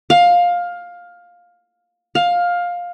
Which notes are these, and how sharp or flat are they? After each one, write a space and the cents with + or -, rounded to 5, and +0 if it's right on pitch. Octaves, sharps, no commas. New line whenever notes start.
F5 +15
F5 +15